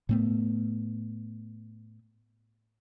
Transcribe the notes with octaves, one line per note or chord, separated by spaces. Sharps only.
A2 A3 B3